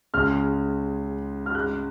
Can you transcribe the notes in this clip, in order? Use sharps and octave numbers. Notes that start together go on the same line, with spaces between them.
C#2 C#3 G#3 F6
F6
F#6